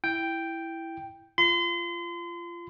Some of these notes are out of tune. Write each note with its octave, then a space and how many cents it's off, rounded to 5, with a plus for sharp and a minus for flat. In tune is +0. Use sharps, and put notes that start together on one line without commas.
E4 +0 G5 +0
F4 -20 C6 -35